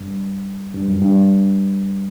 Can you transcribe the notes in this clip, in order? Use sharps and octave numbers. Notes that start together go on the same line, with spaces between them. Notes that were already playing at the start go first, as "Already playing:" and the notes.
Already playing: G2
G2
F#2
G2